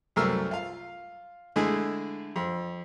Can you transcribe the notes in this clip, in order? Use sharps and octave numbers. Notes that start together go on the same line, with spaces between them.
C2 F#2 A3 A#4 E6 F6
F4 F5
D3 G#3 A3 E4 G#4
F2